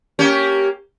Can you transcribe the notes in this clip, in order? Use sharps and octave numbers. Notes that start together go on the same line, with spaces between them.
A#3 C#4 G4